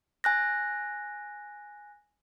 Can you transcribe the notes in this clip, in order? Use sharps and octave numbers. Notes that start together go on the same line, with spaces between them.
G#5 F#6 A#6